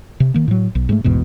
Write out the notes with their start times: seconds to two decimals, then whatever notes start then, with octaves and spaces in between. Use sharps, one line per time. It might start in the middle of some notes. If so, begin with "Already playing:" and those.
0.20 C3
0.34 D#3 A#3
0.48 A2 F#3
0.75 B1
0.89 G#2 F3 A3
1.04 A1 E2 G#2 B2